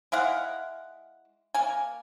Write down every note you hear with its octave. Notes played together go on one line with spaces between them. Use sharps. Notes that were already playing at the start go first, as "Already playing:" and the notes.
G#3 E4 F5 F#5
A#3 G#5